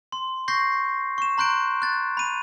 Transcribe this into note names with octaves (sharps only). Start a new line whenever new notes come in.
C6
C#6 G6 A#6 C7
C#6 E7
A#5 C6 F#6 G6 D7
F#6 A6
B5 D#7